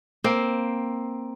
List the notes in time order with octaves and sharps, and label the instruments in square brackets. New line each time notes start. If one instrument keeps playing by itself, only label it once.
[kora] A#3 C4